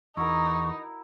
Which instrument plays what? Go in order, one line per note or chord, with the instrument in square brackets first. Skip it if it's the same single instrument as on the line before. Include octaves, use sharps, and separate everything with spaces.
[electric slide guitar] E2 [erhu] D#4 [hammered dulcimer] E4 F#4 A#4 [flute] C#6